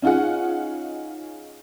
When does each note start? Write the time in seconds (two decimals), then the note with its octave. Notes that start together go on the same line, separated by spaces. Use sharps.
0.02 C#4 D#4 F4 G#4 F#5